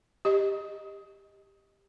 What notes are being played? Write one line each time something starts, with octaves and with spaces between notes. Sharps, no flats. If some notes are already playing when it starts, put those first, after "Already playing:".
G4 D#5